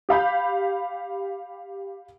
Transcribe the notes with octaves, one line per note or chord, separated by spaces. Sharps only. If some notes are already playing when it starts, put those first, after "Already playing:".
G4 F5 B5 G6